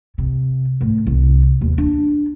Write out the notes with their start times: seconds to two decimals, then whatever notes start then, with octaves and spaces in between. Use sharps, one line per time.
0.18 C3
0.81 A2
1.07 C2
1.61 D#2
1.78 D4